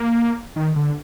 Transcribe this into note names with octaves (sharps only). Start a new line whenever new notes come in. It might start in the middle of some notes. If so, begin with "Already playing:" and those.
Already playing: A#3
D#3
D3